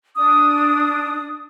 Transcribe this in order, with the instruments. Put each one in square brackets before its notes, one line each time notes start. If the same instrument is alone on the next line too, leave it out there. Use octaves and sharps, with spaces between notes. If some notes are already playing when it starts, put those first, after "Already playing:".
[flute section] D4 D#6